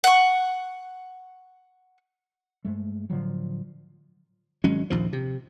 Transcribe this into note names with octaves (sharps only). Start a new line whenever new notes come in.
F#5 C#6
G2 G#3 A3
A2 D3 F3 F#3
G#1 F#3 G#3 C#4
A#1 D#2 F3
C3